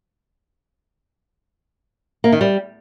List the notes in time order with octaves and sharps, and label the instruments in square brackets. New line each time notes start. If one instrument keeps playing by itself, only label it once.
[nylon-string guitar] A#3
D#3
G3